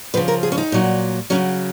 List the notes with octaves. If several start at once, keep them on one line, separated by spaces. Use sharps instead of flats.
C#3 F3 B4
A#4
G#4
C#4
D#4
A#2 F#3
C#3 F#3 C#4